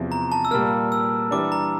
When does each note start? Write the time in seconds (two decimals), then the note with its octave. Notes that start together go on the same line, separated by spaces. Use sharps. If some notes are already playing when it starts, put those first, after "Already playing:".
Already playing: E2 C3 F3
0.12 A#5
0.32 A5
0.45 E6
0.51 A#2 G3 A#3 F6
0.92 E6
1.31 E3 G3 D4 D6
1.52 A#5